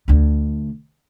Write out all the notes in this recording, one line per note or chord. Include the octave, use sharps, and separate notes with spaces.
D2 D4